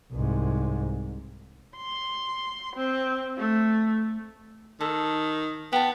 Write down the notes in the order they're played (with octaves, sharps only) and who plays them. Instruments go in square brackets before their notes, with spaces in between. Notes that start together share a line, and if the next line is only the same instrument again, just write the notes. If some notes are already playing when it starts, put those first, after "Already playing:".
[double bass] C2 G#2
[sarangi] C6
C4
A3
[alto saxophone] D#3 [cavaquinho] A4
[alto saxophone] B3 [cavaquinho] G5 A5